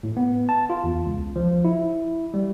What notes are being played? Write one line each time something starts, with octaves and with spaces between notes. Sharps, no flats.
A2
B3
A5
F4
E2
C#2
F3
E4
G3